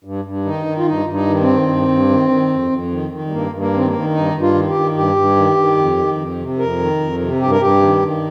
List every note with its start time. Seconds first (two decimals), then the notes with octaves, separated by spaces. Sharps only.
0.05 G2
0.25 G2
0.45 D#3 D#4
0.66 D#3
0.78 F4
0.86 G2 D#4
1.06 G2
1.13 D#4
1.27 D#3
1.41 C4
1.48 D#3
1.68 G2
1.88 G2
2.09 D#3
2.29 D#3
2.50 F2
2.71 F2
2.91 D#3
3.11 D#3
3.27 G3
3.32 G2 A#3
3.52 G2
3.59 A#3
3.73 D#3 C4
3.86 A#3
3.93 D#3
4.14 G2 D#4
4.34 G2
4.41 F4
4.54 D#3
4.68 G4
4.75 D#3
4.96 G2 G4
5.16 G2
5.36 D#3
5.57 D#3
5.77 F2
5.98 D#3
6.18 F2
6.38 C3
6.58 F2 A#4
6.79 D#3
7.00 F2
7.20 C3
7.40 G2 G4
7.51 A#4
7.61 G2 G4
7.82 D#3
8.02 D#3